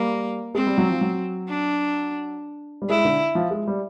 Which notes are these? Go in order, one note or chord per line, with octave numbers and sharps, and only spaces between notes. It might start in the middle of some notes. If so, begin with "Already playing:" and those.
Already playing: G3 A#3
G#3 C4
G3
F#3
F3
F#3
D4
G3
G#3 E4
D3
F3
G#3
G3